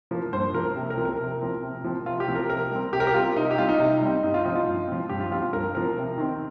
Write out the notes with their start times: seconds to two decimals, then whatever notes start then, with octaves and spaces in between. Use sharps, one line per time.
0.11 F3 A#3
0.33 G2 C5
0.54 F3 A#3 A#4
0.75 C3
0.90 A#4
0.97 F3 C4
1.05 A#4
1.19 C3
1.41 F3 C4
1.62 C3
1.84 F3 C4
2.06 C3 F4
2.20 G4
2.28 F3 C4
2.35 A#4
2.50 C3 A#4
2.71 G3 C4
2.93 C3 G4
3.00 A#4
3.07 G4
3.14 G3 C4 F4
3.36 C3 D#4
3.51 G4
3.58 G3 C4 F4
3.69 D#4
3.79 C3
4.01 G3 C4
4.23 G2 D#4
4.34 F4
4.45 F3 C4 D#4
4.55 F4
4.66 G2
4.88 F3 C4
5.09 G2 G4
5.20 F4
5.31 F3 C4 F4
5.42 F4
5.53 G2 A#4
5.74 F3 C4 A#4
5.97 C3
6.18 D#3 C4